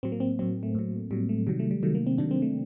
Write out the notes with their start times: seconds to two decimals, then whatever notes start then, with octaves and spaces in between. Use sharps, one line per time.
0.03 A2 F#3 C4
0.12 A#3
0.20 C4
0.39 A2 F#3 C4
0.63 A3
0.75 A2 F#3
1.11 A2 F#3 G3
1.29 A3
1.47 C3 D#3 F#3 G3
1.59 A3
1.71 G3
1.83 C3 D#3 F#3 A3
1.95 A#3
2.07 C4
2.18 C3 D#3 F#3 D4
2.31 C4
2.42 A3